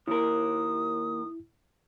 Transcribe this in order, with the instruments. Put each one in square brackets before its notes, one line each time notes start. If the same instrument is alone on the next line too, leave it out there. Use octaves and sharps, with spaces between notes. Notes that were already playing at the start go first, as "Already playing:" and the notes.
[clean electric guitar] D#2 A#4 [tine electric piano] E4 [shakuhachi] D#6